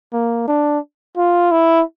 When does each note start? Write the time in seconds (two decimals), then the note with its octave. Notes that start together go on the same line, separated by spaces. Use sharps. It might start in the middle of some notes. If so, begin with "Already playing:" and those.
0.13 A#3
0.48 D4
1.17 F4
1.52 E4